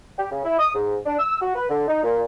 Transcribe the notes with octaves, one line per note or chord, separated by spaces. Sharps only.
G4
C#3
E4
D#6
G#2
D4
E6
F#4
B4
D3
D#4
A#2